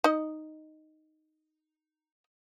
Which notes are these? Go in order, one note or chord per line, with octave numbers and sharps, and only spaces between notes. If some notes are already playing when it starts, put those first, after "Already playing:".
D#4 D#5